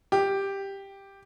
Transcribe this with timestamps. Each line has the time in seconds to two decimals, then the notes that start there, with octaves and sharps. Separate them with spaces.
0.12 G4